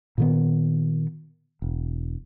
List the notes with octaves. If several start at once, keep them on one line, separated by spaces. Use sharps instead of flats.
A#2 D#3 B3
E1